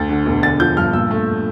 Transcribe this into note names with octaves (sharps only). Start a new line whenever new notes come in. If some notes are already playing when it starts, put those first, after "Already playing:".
Already playing: D2 A6
D3
E1
D3 A6
F3 G6
G2 F6
A#2 E6
A3